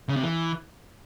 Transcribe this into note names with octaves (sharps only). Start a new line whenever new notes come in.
C#3
C3
E3